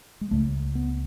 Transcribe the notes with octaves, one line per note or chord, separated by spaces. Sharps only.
G#3
C#2 C#3 A3
B3